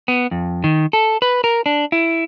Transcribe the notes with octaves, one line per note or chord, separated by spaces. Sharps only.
B3
F2
D#3
A4
B4
A#4
D4
E4